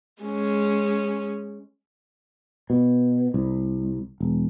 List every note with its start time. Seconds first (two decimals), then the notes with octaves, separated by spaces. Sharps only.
0.23 G#3 C#4
2.70 B2
3.34 C2
4.20 E1